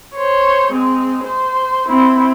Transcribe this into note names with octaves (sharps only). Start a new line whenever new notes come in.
C5 C#5
G#3 C4
C5
C4 E4